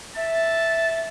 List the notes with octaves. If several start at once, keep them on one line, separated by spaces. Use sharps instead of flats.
E5 A5